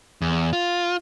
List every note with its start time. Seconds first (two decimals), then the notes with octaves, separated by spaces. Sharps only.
0.22 E2
0.53 F4